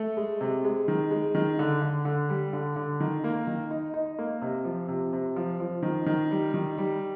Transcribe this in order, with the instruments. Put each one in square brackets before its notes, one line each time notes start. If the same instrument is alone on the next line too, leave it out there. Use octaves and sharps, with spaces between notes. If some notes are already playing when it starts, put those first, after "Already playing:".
Already playing: [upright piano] A3
G#3
C3
G#3
D#3
G#3
D#3
D3
D3
D3
G3
D3
D3
D#3
A#3
D#3
D#4
D#4
A#3
C3
F3
C3
C3
F3
F3
D#3
D#3
G3
D#3
G3